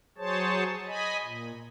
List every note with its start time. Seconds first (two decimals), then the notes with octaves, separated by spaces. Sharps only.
0.18 F#3 G#4 C5 C#5 A5
0.87 D#5 G#5 B5
1.23 A#2